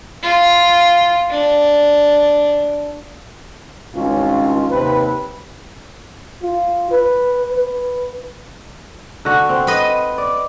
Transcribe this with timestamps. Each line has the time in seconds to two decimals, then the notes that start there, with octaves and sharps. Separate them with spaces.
0.23 F4
1.30 D4
3.95 G#1 C#2 G2 C#4 F4
4.70 D#2 C3 C4 B4
6.43 F4
6.91 B4
7.52 B4
9.25 D3 F#4
9.49 C4
9.67 B4 D#5
10.18 D5